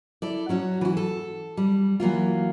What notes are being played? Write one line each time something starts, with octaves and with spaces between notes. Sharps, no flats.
E4 A4 D5
F#3 C#4 F#4
E3 F#4
A4
G3
E3 F#3 A#3 F4